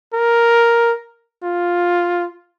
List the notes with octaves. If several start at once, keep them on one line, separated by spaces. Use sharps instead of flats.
A#4
F4